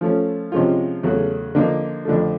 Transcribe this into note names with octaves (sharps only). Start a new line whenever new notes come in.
F3 A3 C#4
C3 F3 G#3 C#4 F4
E2 C#3 F#3 A3
D3 F3 A#3 D#4
F2 D3 F3 A3